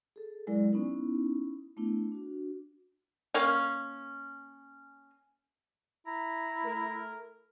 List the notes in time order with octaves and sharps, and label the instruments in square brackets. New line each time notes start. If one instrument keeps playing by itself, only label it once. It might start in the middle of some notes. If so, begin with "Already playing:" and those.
[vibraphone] G#4 A4
F#3 G#3 E4 A#4 D5
B3 C#4 D#4 E4
A3 B3 D4 E4
D4 F#4
[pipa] A#3 C#4 F5
[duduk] E4 [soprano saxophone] A#5
[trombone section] A3 A#4